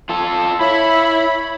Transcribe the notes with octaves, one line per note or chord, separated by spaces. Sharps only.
F4 A4
E4 C#5 B5